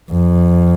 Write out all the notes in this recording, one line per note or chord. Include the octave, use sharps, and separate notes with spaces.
F2